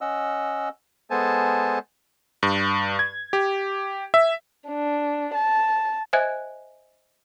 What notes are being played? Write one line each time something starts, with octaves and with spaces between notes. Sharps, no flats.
C#4 D#5 F#5 E6
G#3 B3 A4 C5 G#5 A5
G2
G#6
G4
E5
D4
A5
C5 D#5 E5 G#5 F#6 G#6